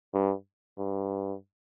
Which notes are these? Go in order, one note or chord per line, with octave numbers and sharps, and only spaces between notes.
G2
G2